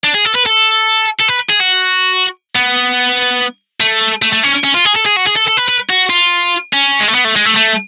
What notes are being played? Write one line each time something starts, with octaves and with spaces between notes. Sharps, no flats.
D4
G#4
A4
B4
A4
A4
B4
G#4
F#4
B3
A3
A3
A3
C#4
C#4
F4
G#4
A4
G#4
F#4
G#4
A4
A4
B4
B4
F#4
F4
C#4
G#3
A3
B3
A3
G#3
A3
A3